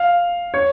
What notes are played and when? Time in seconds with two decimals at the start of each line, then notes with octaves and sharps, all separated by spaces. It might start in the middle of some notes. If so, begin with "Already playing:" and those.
Already playing: F5
0.54 C#5